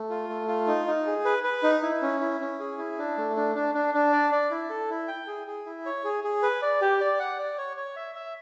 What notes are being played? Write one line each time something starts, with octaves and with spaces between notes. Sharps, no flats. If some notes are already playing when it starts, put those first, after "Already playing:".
Already playing: A3
F4
A3
F4
D#4
D#4
G#4
B4
B4
D#4
E4
C#4
E4
C#4
G#4
E4
D4
A3
D4
D4
D4
D4
D5
D5
E4
A4
E4
G5
G#4
G#4
E4
C#5
G#4
G#4
B4
D5
G4
D5
F#5
D5
C#5
C#5
E5
E5